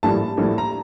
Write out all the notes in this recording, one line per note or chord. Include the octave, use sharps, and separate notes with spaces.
A#1 A2 G3 A5
A#1 A2 G3
A#5